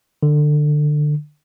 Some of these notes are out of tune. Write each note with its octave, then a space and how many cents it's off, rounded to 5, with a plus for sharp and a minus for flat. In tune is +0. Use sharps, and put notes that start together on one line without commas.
D3 +20